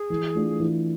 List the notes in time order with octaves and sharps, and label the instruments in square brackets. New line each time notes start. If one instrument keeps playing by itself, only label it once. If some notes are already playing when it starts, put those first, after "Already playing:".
Already playing: [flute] G#4
[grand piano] E3
A3 D4 F4
E3